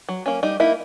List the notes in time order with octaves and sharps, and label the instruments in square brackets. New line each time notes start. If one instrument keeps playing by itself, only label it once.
[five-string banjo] F#3
A#3 C#4
G3 D#4
A#3 D#4 E4